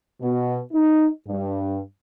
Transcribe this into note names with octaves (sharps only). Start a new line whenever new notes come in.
B2
D#4
G2